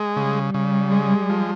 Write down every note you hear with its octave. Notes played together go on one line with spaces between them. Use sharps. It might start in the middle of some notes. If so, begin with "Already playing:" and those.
Already playing: G#3
C#3 G3
C#3
G#3
F3